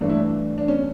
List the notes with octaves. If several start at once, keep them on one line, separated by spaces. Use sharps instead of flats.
G2 E3 A3 D4
E4
D4
D4
C#4